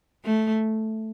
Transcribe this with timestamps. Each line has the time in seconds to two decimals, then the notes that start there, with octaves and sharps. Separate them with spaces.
0.25 A3